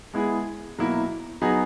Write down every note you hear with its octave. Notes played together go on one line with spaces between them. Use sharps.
G#3 B3 E4 G#4
B2 F#3 A#3 E4
F#3 B3 D#4 G#4